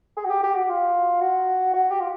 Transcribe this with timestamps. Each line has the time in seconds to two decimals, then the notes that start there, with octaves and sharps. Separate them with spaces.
0.17 G#4
0.25 F#4
0.30 G4
0.43 G4
0.55 F#4
0.69 F4
1.21 F#4
1.74 F#4
1.91 G4
2.00 F4